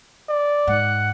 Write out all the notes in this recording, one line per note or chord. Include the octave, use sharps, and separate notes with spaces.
D5
G#2 F#5